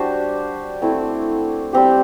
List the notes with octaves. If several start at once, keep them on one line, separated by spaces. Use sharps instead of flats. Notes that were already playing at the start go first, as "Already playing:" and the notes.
Already playing: G3 D4 F#4 C5
A3 C4 E4
G3 C4 G4